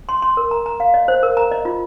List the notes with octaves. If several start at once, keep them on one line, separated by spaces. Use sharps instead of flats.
C6
C6
A#4
A#5
A#5
F5
D#5
C5
A#4
A#5
D#5
F4